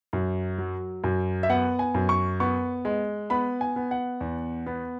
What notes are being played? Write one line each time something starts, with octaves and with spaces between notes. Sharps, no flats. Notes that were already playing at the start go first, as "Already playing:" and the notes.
F#2
F#3
F#2
E5
B3 F#5
G#5
F#2
C#6
B3 C#6
G#3
B3 B5
G#5
B3
F#5
E2
B3